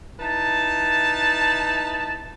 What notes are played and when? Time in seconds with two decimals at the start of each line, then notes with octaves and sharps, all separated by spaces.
0.19 D#4 E4 B4 A5